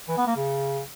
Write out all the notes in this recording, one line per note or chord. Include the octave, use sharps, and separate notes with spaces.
E3
B3
A#3
C#3